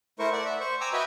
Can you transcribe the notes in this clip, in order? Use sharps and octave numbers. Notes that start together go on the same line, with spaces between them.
A3 E4 A#4 C5 C#6
D5 F#5
E5
C5 C#6
G5 G#5 A#5 D6 E6
F#4 B4 D#5 E5 G5 G#5